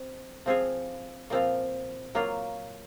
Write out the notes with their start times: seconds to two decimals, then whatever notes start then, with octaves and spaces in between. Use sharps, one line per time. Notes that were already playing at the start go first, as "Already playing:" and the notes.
Already playing: C4
0.46 F3 C4 F4 G#4
1.30 A#2 F3 C4 F4
2.15 F#3 A#3 F4